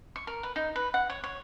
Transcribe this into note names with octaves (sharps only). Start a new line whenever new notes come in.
C#6
A#4
B4
D#4
B4
F#5
C#5
C#5